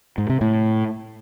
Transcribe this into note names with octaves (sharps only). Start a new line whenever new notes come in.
G#2
C3
A2